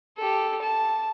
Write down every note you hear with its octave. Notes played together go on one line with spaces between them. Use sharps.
G4 A4
A5